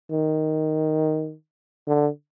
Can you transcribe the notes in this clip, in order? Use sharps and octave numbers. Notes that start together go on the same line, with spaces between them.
D#3
D3